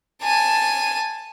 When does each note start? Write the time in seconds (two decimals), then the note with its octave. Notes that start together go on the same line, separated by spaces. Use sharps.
0.23 G#5 A5